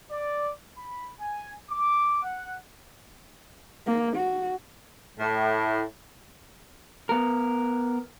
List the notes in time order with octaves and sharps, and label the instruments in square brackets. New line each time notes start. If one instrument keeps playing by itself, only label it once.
[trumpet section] D5
B5
G#5
D6
F#5
[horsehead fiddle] A#3
F#4
[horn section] A2
[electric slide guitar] B3 A#4